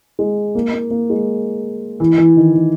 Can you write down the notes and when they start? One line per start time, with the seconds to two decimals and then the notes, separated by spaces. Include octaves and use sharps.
0.19 G#3
0.55 A#3
0.73 A#3
0.90 A#3
1.10 G#3
2.00 E3
2.18 E3
2.37 D#3
2.55 D#3